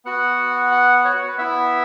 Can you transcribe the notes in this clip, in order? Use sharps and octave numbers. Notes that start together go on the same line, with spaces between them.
B3 F#4 F#5
F#5
C#5
F#5
B4
B3 E4 E5